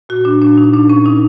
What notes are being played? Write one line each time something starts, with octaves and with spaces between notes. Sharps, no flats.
A#2 F#4
A#2 D4
A#2 D4
A#2 D#4
A#2 D4
A#2 C#4
A#2 D#4